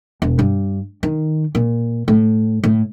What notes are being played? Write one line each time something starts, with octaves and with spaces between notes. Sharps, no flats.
E1
G2
D#3
A#2
A2
A2